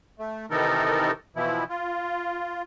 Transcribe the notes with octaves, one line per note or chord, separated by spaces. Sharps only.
A3
C3 D#3 E3 D#4 A4 A#4
B2 E3 F3 E4
F4